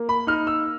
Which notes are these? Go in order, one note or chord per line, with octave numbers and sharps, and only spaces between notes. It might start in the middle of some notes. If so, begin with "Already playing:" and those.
Already playing: A#3
B5
D#4 F6
E6